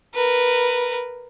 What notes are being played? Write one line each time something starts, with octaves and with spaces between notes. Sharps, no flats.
A#4 B4